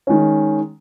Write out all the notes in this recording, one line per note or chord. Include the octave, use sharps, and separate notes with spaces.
D#3 G#3 C#4